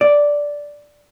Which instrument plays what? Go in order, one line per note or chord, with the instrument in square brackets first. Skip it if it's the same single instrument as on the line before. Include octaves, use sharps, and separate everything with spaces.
[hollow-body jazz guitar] D5